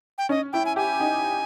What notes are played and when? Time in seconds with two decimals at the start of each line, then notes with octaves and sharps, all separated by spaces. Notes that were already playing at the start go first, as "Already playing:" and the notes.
0.18 G5
0.29 C#4 D#5
0.53 E4 G5
0.65 G#5
0.76 G4 G#5
1.00 D#4